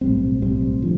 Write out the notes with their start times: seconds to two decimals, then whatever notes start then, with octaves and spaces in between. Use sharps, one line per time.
0.01 B1 A2 G3 C4
0.42 B1 A2 G3 C4
0.82 D3 F3